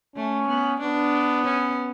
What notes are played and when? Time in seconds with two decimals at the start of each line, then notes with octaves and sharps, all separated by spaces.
0.16 A3 C#4
0.47 B3
0.80 B3 D4
1.45 C#4